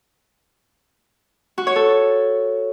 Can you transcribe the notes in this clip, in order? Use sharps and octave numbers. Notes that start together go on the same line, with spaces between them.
F#4
C#5
A4